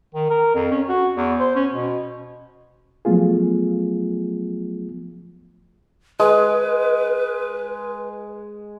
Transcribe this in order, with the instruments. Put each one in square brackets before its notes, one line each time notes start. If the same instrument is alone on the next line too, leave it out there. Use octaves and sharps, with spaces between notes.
[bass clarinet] D#3
A#4
F2
C#4
F#4
E2
C5
C#4
B2
[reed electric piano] F3 F#3 A3 B3 F4 G#4
[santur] G#3 [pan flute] B4